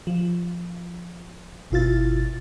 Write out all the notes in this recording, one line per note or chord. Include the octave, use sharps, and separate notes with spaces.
F3
G1 B2 E4 F4 A6